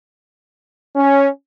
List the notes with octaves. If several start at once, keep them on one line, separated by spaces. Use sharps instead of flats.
C#4